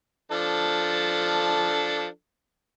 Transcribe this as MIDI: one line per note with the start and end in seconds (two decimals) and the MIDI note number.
0.32 2.07 53
0.32 2.07 62
0.32 2.07 69